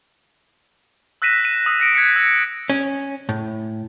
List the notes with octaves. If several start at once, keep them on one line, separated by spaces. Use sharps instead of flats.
E6 F#6 A#6 B6 D#7 E7
D#7 E7
D#6 E6 A#6 E7
A#6 C#7 D7
F#6 G#6 B6 C#7
E6
C#4
A2